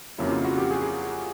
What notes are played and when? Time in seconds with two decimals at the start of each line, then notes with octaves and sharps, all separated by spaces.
0.18 F2 C#3 F#3 A#3 E4
0.31 F4
0.45 F#4
0.58 G4
0.71 G#4